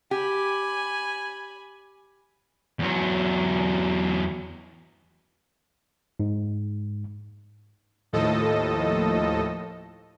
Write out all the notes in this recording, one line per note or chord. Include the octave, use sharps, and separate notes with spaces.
G4 G#5 B5
E2 F#3
G#2
D#2 A2 F3 A4 D#5